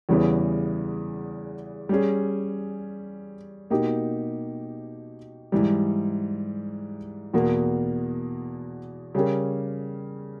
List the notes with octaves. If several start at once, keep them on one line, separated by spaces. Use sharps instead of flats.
E2 C#3 E3 G3 B3
G3 C#4 G#4
B2 A#3 D#4 G4
G#2 E3 G3
E2 B2 A#3
C#3 G3 C#4 G4 A#4